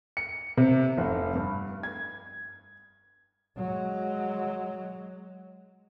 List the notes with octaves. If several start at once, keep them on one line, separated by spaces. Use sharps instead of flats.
C#7
C3
F1
G2
G#6
F#3 G#3